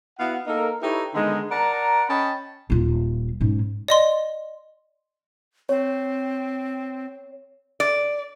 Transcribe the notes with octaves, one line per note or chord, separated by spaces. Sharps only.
B3 E4 F#4 F5 F#5
A#3 D#4 A4 A#4
D#4 E4 G4 A4 B4 C#5
D3 D#3 G#3 B3 D#4
A#4 D5 F#5 A5 A#5
C#4 D#5 G5 A5 B5
D#1 F4
G#2 C#4
D5 D#5 C6
C4 C#5
D5